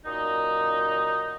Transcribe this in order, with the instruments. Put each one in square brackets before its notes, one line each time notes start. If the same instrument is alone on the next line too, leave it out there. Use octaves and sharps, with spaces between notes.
[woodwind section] F#2 A#2 D#4